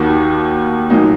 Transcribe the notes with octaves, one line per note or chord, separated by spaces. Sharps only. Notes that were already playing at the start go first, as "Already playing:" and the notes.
Already playing: D#2 D#3 A#3 F#4
A#2 F#3 A#3 D#4